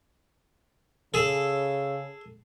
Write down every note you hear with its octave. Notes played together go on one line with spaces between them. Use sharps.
C#3 G#4 A4